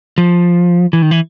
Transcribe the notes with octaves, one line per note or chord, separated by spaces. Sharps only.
F3
E3
D#3
E3